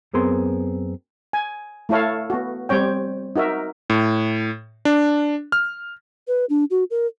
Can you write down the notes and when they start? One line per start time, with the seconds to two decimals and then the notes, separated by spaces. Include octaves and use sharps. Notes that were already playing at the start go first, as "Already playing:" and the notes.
0.14 F#2 B3 C4 G#4 A#4 C6
1.33 G#5
1.89 A3 E4 A4 C#5 F5
2.30 B3 F#4
2.69 G3 C4 C#5 G5
3.36 D#4 F#4 A#4 E5
3.90 A2
4.85 D4
5.52 F6
6.28 B4
6.50 D4
6.70 F#4
6.91 A#4